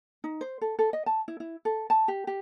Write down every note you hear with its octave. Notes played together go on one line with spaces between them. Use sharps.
D#4
C5
A4
A4
D#5
A5
E4
E4
A4
A5
G4
G4